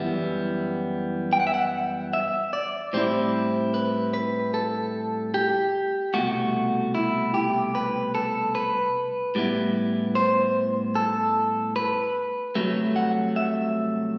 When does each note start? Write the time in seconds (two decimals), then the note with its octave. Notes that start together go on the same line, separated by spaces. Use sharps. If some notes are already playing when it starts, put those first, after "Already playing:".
Already playing: F#2 E3 G3 B3 E5
1.33 G5
1.40 F#5
1.47 E5
1.54 F#5
2.13 E5
2.53 D5
2.93 A2 G3 C4 E4 C5
3.74 B4
4.14 B4
4.54 A4
5.34 G4
6.14 C2 B2 A3 F#4
6.95 E4
7.34 G4
7.75 B4
8.15 A4
8.55 B4
9.35 A2 G3 B3 E4
10.15 C5
10.95 A4
11.76 B4
12.55 C2 C3 F#3 A3
12.96 F#5
13.36 E5